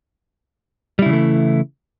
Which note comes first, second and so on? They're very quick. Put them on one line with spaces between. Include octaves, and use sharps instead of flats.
G3 E4 C#3 E3 A3